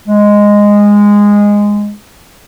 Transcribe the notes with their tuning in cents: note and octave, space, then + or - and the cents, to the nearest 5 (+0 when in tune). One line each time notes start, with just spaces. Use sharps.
G#3 -10